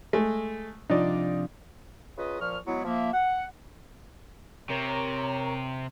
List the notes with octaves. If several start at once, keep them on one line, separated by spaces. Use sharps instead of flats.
G#3 A3
C3 F3 D4 D#4 D5
C#3 F4 B4 D#5
A#2 F3 C#6 F6
F#3 G#3 B3 E4
F3 A#3 E5
F#5
C3 A#4 C#5 A#5